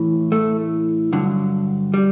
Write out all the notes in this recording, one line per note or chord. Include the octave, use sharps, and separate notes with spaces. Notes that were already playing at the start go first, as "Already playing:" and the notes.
Already playing: A2 E3
A3
G2 D3 F#3
G3